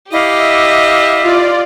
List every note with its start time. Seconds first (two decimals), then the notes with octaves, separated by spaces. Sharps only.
0.11 E4 G4 D#5 F5 D6
0.42 E5
1.24 F4 D5